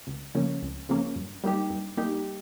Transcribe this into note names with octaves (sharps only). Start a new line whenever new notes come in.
C#2
C#3 F3 A#3 C#4
C#2
C#3 F3 A#3 C#4
G2
G3 A#3 D#4 G4
G2
G3 A#3 D#4 G4